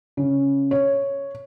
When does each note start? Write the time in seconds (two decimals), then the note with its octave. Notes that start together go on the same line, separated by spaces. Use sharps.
0.17 C#3
0.71 C#5